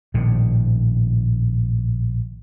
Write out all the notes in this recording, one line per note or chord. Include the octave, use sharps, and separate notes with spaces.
A#1 A2 C3 D#3